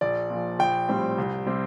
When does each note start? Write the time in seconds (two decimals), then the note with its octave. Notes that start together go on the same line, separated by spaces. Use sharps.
0.01 A#1 D5
0.30 A#2 F3
0.59 A#1 G5
0.89 A2 G3 C4
1.18 C2
1.46 C3 G3 C4